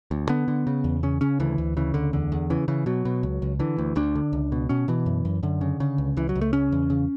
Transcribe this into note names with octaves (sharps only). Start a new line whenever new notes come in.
D2
D3 B3
D3
C#3
E2
C#3 C#4
C#3 C#4
D2 E3
D2
C#3 E3
D2 D3
E2 D3
E2
C#3 E3
C#3 E3
B2 F#3
B2
C#2
C#2
D3 E3
D2
D2 D4
D3
C#2
B2
B2 C#4
B2 E3
F#2
F#2
F#2 D3
C#3
C#3
C#2
C#2 E3
F#3
C#2
A3
C#3 C#4
E2
C#3